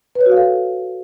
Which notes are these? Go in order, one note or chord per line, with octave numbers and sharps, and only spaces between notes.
B4
C#5
F#4
F5
A4